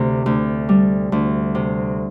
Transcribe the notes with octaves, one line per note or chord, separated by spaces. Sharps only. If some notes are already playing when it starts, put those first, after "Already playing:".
Already playing: D2 C3
D2
G3
D2
C3